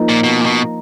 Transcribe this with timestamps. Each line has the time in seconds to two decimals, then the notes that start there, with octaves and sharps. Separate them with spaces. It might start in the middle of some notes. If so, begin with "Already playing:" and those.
Already playing: F3 A#3 D#4
0.09 A#2
0.24 B2
0.41 A#2
0.46 B2